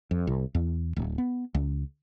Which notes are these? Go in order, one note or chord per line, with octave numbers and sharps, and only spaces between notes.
F2
C2
E2
D1
B3
C#2